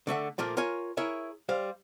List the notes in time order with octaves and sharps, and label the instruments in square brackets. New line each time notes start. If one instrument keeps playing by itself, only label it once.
[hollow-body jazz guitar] D3 A3 E5 F#5
A#2 F3 A3 A#3 A#4
F4 A#4 C#5 G#5
E4 G#4 A#4 C#5 E5
G3 C5 F5